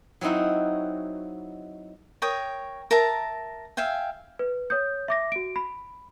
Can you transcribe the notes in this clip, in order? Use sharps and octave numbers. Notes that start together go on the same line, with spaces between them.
F#3 C4 D#4 E4 F#4
A#4 C#5 G5 D#6
A#4 E5 A5 A#5
E5 F5 G5 G#5
B4
C#5 D#6 G6
E5 D6 A#6
F#4 D7
B5